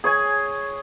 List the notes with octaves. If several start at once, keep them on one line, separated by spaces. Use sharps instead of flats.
G#4 C#5 G#5